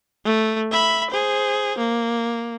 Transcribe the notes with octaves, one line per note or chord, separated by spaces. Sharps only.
A3
E5 B5
G#4 C5
A#3